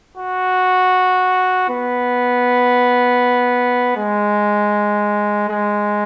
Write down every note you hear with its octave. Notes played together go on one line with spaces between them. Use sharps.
F#4
B3
G#3
G#3